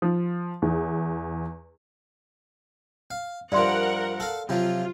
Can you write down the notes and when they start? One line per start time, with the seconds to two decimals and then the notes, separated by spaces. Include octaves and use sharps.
0.02 F3
0.62 E2
3.11 F5
3.52 G2 F3 A#4 D5 E5 F#5 C6
4.20 A4 F5
4.49 C3 F3 F#3 F4